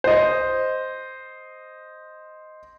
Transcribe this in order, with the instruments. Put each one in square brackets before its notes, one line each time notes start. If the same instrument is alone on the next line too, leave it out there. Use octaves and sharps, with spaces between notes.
[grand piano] C5 D#5